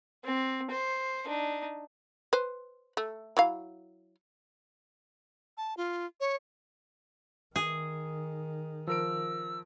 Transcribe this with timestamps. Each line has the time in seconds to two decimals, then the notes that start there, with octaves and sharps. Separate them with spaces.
0.24 C4
0.71 C5
1.26 D4 D#4
2.33 B4 C5
2.97 A3
3.37 F#3 E4 F5
5.57 A5
5.77 F4
6.20 C#5
7.56 D#3 G#4
8.87 F3 A#4 E6 D7